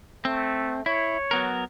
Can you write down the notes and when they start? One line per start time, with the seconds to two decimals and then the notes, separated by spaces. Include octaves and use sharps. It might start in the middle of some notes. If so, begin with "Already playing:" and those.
0.25 A3 C4
0.86 E4 C#5
1.31 F#3 B3 A#4